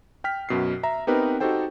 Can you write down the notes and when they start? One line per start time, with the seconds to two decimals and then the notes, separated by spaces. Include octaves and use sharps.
0.24 G5 F6 B6
0.49 F#2 B2 C7
0.83 E5 A#5
1.07 B3 C4 D#4 G4 A#4 B4
1.40 D#4 F#4 G4 A4 C5 G5